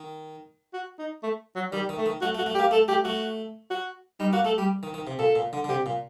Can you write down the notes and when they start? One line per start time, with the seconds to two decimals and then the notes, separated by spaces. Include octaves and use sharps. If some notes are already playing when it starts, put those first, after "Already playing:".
Already playing: D#3
0.74 F#4
0.99 D#4
1.23 A3
1.56 F#3
1.72 D#3 G3
1.89 D#3
1.98 A3
2.06 D#3
2.22 A3 F#4
2.35 A3
2.39 F#4
2.46 A3
2.55 G4
2.59 A#3
2.71 A3 A4
2.88 A3 G4
3.04 A3 F#4
3.70 F#4
4.20 G3 D#4
4.33 A#3 F#4
4.45 A3 A4
4.58 G3 G4
4.83 D#3
4.94 D#3
5.07 C3
5.19 A#2 A4
5.36 A#2
5.53 D3
5.64 D3
5.69 C3 G4
5.86 A#2